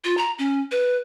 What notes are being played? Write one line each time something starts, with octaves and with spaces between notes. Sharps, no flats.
F4
A#5
C#4
B4